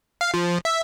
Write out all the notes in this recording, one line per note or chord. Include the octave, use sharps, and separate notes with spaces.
F5
F3
E5